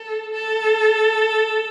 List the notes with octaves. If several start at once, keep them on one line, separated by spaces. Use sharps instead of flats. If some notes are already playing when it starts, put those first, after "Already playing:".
Already playing: A4
A4